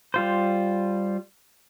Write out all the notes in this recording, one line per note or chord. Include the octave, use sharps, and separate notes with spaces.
G3 F4 C5